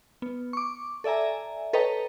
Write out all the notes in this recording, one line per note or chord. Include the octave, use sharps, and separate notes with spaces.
B3
C#6 D6
A4 D5 E5 G#5 A#5
A4 B4 C#5 D#5 G5 A#5